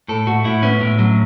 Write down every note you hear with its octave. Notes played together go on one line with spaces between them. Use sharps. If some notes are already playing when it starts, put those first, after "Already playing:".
A2 A4
A2 F#4
A2 E4
B3 C#4
A2
F#3